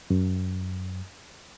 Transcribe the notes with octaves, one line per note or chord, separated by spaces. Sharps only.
F#2